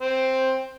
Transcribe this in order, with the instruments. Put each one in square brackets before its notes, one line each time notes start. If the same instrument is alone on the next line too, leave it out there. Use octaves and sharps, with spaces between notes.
[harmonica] C4